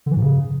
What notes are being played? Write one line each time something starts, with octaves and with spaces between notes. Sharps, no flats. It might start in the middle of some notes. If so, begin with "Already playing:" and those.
D3
E3
G#2
C#3